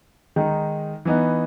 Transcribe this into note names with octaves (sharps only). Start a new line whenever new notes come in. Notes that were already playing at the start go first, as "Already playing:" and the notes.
D#3 G#3 D#4
E3 B3 D#4